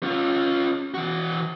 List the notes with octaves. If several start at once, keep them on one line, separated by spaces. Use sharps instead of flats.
C#4 F4
E3 F#4